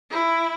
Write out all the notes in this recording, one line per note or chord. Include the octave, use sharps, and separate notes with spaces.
E4